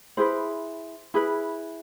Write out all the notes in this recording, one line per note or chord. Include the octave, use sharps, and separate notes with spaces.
E4 G#4 B4 C5
E4 G#4 B4